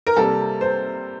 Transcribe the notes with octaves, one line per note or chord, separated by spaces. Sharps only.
A#4
C3 G3 A#3 A4
C5